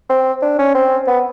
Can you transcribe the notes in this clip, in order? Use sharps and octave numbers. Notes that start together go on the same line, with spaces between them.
C4
D4
C#4
C4
B3